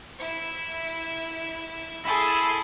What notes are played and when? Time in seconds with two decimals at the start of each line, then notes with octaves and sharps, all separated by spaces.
0.18 E4 E5
2.05 E4 G#4 A4 C6